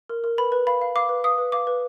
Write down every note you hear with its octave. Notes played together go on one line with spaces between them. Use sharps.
A#4
A#4
B4 B5
B4
F5 B5
F5
F5 D6
B4
F5 D#6
B4
F5 D6
B4